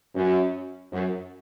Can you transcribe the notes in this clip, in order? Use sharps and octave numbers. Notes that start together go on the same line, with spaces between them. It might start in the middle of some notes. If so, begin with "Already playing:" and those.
F#2
F#2